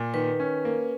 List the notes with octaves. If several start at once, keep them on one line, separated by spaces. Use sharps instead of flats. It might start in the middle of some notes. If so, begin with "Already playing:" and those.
Already playing: A#2
D#3 B4
C#4
A#3